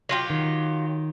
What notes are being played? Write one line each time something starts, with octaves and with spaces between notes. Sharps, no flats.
F#3 F4 G4
D#3